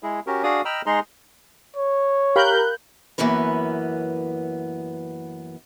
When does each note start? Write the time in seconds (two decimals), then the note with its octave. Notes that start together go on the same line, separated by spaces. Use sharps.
0.03 G#3 E4 G#4
0.27 C#4 F#4 G4 A#4
0.44 D4 F#4 G#4 D5 F5 D#6
0.65 D#5 G5 A#5 B5 E6 F6
0.86 G#3 D#4 G#4 A#5 C6
1.77 C#5
2.36 G4 A#4 F5 B5 F#6 G6
3.18 F#2 E3 A#3 B3 C#4 B4